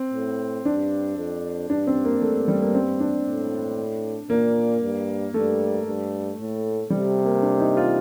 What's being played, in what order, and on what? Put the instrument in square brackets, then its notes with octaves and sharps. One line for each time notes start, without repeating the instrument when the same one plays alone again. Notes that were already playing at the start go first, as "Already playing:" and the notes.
Already playing: [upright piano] C4
[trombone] A2
[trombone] G2 [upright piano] D4
[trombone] F2
[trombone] G2 [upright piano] D4
[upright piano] C4
A#3
[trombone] G2 [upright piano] A3
[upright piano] G3
A#3
C4
D4
[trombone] A2
[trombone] A#2 [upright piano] A#3
[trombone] G2
[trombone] G2 [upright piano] A3
[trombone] G2
A2
[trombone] C3 [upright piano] G3
[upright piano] A#3
D4
D#4
F4